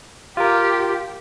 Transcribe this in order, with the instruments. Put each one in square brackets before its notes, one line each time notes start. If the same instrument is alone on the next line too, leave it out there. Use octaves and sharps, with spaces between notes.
[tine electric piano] F4 A#4 [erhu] G4